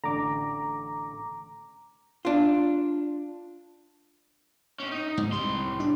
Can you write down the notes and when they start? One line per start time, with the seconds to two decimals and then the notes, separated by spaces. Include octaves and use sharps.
0.04 A1 D3 A#5 D6
2.25 D4 F4
4.80 A2 C#4
4.91 D#4
5.17 G#2
5.32 C2 A2 G3 C6
5.80 D4